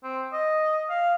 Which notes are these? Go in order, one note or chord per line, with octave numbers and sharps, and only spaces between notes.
C4
D#5
F5